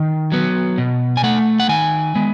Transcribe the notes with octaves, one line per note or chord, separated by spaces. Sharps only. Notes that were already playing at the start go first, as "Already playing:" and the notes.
Already playing: D#3
F#3 B3
B2
G#5
A3 F#5
F#5
D#3 G#5
G#3 B3